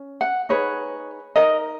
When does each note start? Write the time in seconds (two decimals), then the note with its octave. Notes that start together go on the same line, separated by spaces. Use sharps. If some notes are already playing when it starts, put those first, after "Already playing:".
Already playing: C#4
0.21 F#5
0.49 D#4 G#4 B4 C#5
1.36 D#4 A#4 D#5